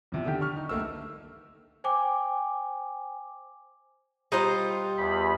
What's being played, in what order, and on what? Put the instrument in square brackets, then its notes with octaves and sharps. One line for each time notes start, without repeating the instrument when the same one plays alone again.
[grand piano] E2 C3 F3
D3 D#3 G4
C#6 F6
D#4
D2 A3 A#3 E6
[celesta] C5 G5 G#5 D6
[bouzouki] G3 F4 C5 [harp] D#5 A#5 F#6
[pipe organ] E2 B5